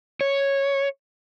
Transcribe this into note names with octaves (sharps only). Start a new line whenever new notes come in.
C#5